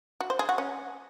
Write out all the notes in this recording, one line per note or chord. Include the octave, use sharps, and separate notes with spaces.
F#4
C5
G#4
F#4
C#4